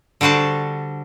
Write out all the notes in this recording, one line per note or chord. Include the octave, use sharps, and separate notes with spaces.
D3 G3 F#4 C5 A5